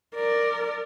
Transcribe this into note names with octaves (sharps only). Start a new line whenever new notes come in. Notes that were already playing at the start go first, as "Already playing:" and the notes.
A#4 D5